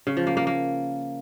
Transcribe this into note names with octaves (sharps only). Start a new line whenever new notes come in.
C#3
F3
A#3
A#3
A#3